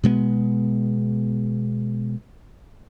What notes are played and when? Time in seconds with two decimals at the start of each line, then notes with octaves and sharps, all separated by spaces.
0.04 B2 G#3 A#3 B3